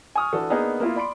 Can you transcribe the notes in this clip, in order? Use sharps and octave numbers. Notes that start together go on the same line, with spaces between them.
G#5 C#6 D#6 F6
E3 D4 F#4 A4
A#3 B3 D4 D#4 G#4 A#4
A#3 B3 E4 F4 A#4
D5 B5 C6 D7